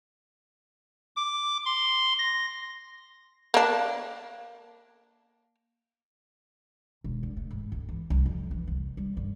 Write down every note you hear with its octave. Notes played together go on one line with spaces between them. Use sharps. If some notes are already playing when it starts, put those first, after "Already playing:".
D6
C6
A#6
A#3 D4
E1
D3
A3
G#2
D2
E3
C2
F2
E3
C2
G3
G1